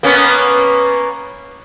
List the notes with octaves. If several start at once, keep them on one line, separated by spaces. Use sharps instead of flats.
A#3 B3 C#4